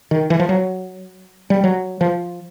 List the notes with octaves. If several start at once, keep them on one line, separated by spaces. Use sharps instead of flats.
D#3
E3
F3
F#3
G3
F#3
F3